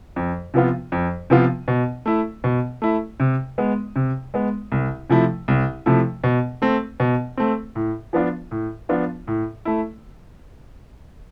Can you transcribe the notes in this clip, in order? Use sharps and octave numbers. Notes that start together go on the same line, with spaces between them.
F2
C3 F3 B3 F4
F2
C3 F3 B3 F4
B2
A3 E4
B2
A3 E4
C3
G#3 B3
C3
G#3 B3
C2
C3 F3 A3 E4
C2
C3 F3 A3 E4
B2
A3 C4
B2
A3 C4
A2
F3 B3 D4 F4
A2
F3 B3 D4 F4
A2
A3 E4